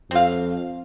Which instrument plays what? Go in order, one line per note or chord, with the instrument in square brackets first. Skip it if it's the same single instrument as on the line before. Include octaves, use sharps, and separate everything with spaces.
[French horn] F2 [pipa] C4 F5